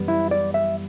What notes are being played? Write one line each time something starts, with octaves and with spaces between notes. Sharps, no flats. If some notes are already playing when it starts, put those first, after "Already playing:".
Already playing: F#2 E3 G3 B3
E4
D5
E5